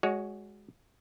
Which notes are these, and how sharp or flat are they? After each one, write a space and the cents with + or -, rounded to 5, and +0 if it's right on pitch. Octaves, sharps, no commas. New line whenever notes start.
G#3 +0 F#4 +0 C#5 +30